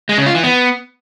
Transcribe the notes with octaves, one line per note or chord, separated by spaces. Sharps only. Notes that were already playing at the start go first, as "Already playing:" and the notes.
G#3
C#3
F4
E3
B3